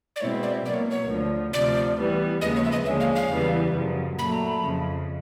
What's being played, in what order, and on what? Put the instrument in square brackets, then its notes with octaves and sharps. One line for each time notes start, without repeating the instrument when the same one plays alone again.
[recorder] D5
[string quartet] B2 G#3 C4 E4 [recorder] C#5
[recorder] D5
[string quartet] B2 F#3 A#3 [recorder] D5
[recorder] C#5
C#5
[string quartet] D2 D3 F3
[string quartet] D2 C3 F3 [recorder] D5
[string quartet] E3 G3 B3
[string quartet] D#2 C#3 F3 G#3 B3 [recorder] D#5
[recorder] C#5
E5
D#5
[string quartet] D#2 D3 F3 G#3 C#4 [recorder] E5
[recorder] F5
F5
[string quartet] E2 C#3 E3 G3 B3
F#2 C#3 F3
[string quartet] A#2 F#3 A3 [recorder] B5
[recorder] A#5
B5
[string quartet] F2 C#3 F3